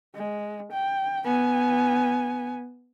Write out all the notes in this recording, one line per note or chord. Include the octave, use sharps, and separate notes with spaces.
G#3
G5
B3 G#5